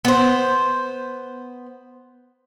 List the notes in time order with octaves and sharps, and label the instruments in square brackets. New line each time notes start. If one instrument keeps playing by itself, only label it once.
[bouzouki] B3 C5